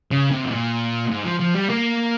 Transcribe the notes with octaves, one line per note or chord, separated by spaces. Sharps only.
C#3
C3
G#2
A#2
G#2
F3
F3
G3
A#3